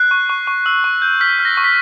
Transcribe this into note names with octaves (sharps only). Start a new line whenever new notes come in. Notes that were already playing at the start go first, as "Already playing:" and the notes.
Already playing: F#6 C7
C#6
C#6
C#6
E6
C#6
G6
F6 B6
F6
A#6
C#6
B6